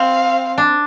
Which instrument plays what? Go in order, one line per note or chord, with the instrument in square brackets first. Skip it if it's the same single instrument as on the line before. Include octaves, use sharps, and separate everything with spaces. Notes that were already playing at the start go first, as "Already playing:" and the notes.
Already playing: [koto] C4 [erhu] F5
[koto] D4